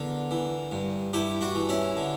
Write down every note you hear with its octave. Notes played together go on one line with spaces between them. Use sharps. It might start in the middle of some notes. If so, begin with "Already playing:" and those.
Already playing: E2 D3 A#4
E3
G2
G2 E4 G4
D4 F#4
E3
C#4 E4
D3